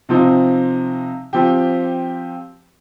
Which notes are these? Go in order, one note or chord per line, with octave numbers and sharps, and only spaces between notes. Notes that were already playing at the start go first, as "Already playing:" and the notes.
C3 F3 C4 D#4
F3 C4 G4